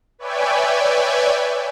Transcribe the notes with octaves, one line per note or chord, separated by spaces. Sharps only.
B4 C#5 D5 E5 G5 G#5